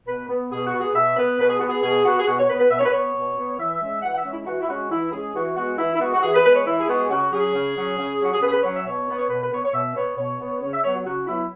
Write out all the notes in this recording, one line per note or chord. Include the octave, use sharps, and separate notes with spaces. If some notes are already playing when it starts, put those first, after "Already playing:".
B2 B4
B3
B2 G#4
F#4
B3
G#4
B2 E5
B3 B4
B2 B4
G#4
B3 F#4
G#4
B2 G#4
B3 F#4
G#4
B2 F#4
C#5
B3 B4
B4
B2 E5
C#5
B4
B3 C#5
B2
B3
E3 E5
G#3 C#4
E3 F#5
F#5
E5
G#3 C#4
E4
E3 F#4
E4
G#3 C#4 F#4
E3 E4
G#3 C#4 G#4
E3 F#4
G#3 B3 F#4
E3 E4
E4
G#3 B3 F#4
F#4
E3 G#4
B4
G#3 B3 B4
C#5
E3 E4
G#4
G#3 B3 F#4
G#4
C#3 F#4
F#3 C#4 G#4
C#3
F#3 C#4
C#3
F#3 C#4 F#4
G#4
C#3 B4
G#4
B4
F#3 C#4 C#5
E5
B2 C#5
B3
C#5
B2 B4
B4
B3 C#5
C#5
B2 E5
B3 C#5
B2 C#5
B3
C#3 C#5
E5
F#3 B3 C#5
F#4
C#3 F#4
F#3 B3 E4